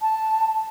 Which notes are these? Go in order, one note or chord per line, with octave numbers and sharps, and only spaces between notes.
A5